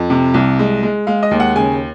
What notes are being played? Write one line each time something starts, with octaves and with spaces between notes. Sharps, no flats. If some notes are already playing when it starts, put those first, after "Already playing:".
Already playing: F2
C3
C2
G#3
G#3
G#3 F5
D#5
D#2
F#5
C#3 G#5